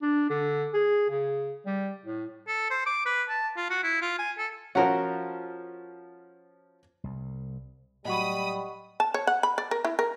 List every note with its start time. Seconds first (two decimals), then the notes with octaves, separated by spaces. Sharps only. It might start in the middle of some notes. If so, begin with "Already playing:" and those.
0.02 D4
0.30 D3
0.74 G#4
1.10 C#3
1.66 G3
2.05 A2
2.48 A4
2.71 C5
2.86 D6
3.06 B4
3.29 A5
3.57 F4
3.70 F#4
3.83 E4
4.02 F4
4.19 G#5
4.38 A4
4.75 F3 C#4 F#4 A#4
7.04 C2
8.05 A2 F#3 G3 D#5 F#5 B5 C#6 D#6
9.00 A5
9.14 C#5
9.27 F#5
9.43 B5
9.58 D5
9.71 A#4
9.85 E4
9.99 A#4